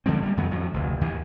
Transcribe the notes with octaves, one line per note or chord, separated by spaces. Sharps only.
D3 F3 G#3 C4
G3 A#3
F2 D#3 F#3 B3
F2 A2 F#3
F1 D2
D#2 D#3 E3